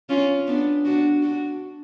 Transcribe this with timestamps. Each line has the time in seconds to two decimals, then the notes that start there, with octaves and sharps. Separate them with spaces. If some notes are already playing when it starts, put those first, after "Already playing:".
0.09 C#4 F4
0.47 B3 D4
0.85 D4 F#4
1.23 D4 F#4